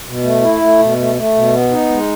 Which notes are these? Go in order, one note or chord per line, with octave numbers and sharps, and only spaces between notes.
B2
A3
E4
A3
B2
A3
A3
B2
B3
D#4
G#3